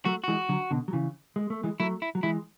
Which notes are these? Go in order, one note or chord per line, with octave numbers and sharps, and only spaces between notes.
F#3 A3 F#4
E3 G#3 F#4
D3 F#3
B2 D3
F#3
C#3 E3
G#3
A3
E3 G#3
F#3 A3 E4
E4
F#3
E3 G#3 E4